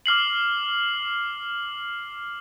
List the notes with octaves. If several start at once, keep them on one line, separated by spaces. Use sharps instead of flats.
D6 F6 C7 F#7